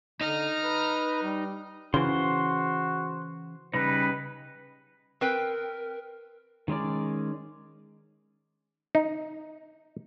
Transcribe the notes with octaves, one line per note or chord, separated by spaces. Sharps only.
D3 D#4 A#5 F6
B4
G3
C#3 E3 F#4 C5 C6
C#3 G3 D#4 B4
C4 A#4 B4 G5
D#3 G#3 C#4 D5
D#4